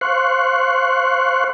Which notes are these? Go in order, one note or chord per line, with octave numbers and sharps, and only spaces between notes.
C5 F5 C6 C#6 F#6